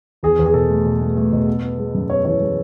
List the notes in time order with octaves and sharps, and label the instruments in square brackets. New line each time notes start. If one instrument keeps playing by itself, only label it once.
[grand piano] E2 G#4
E2
G#4
B2 A4
A3
B2
A3
A3
B2
B3
B3
G#3
F#2
B3 C#5
E3 C#5
G#3